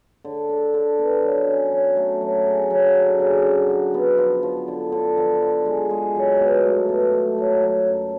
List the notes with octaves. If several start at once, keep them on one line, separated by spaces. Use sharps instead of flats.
D3
D3
D3
B3
F#3
C#4
F#3
A3
F#3
G#4
F#3
D3
C#3
F#4
F#4
B3
F3
F3
D3
D3
F3
F3
G#3
G#3
F#3
B2
A3
B2
A3
F#3
F#3
F#2